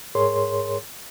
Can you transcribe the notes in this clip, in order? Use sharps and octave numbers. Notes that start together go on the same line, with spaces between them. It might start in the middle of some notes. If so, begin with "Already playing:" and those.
G#2 G#4 A#4 C#5 C6